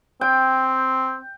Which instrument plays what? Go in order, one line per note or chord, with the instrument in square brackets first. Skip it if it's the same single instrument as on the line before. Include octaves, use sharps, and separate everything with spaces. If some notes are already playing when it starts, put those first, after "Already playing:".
[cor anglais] C4 [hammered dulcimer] G5